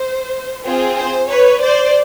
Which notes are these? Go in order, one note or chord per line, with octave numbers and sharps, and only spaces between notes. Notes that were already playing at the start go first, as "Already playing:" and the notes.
Already playing: C5
C4 F4 G#4
C5
B4 C#5
C5 D5